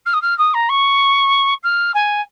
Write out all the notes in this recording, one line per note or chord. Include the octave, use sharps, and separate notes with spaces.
F6
D#6
F6
D#6
A#5
C#6
F6
G#5